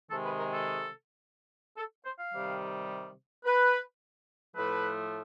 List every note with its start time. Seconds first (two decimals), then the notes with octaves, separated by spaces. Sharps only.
0.10 C3 D#3 G#3 A4
0.24 B4
0.38 A#4
0.52 A4
1.77 A4
2.05 C5
2.19 F5
2.33 C3 D#3 G3
3.45 B4
4.56 A2 F3 A3 B4